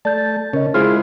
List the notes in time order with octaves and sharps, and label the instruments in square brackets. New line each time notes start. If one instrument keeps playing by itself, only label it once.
[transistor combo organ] A3 A5 [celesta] D5 G6 A6
[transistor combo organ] C#3 C#4 [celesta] A#4 D#5
[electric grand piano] G#3 E4 F4 [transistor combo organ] G#4 C5 [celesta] F6